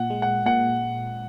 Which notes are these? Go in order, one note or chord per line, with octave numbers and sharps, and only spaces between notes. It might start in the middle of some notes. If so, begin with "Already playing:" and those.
Already playing: A#2 F#5
G#3
F#5
A#2 F#5